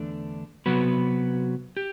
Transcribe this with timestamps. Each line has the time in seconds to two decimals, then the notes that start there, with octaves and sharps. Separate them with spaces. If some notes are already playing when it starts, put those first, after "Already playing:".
Already playing: E2 D3 A3 D4
0.66 C3 F#3 B3 F#4 B4
1.77 G4